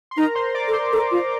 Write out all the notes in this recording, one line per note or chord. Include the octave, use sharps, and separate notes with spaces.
C6
D#4 A#4 A#5
C5 C6
C6
D5 D6
A4
C5 C6
A4
F4